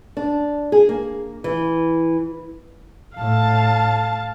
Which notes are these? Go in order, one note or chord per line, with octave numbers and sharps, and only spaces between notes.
D4
G#4
A#3
E3
A2 F5 A5